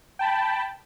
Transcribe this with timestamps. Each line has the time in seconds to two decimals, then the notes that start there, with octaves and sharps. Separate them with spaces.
0.19 G5 A5 B5